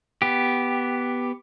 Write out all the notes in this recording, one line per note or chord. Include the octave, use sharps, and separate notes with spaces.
B3 G4